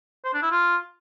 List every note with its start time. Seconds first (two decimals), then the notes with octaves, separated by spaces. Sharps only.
0.25 C5
0.34 D4
0.42 E4
0.51 F4